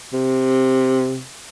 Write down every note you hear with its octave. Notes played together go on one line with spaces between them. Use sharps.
C3